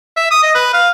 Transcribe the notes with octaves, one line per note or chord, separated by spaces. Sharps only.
E5
D#6
D#5
B4
F5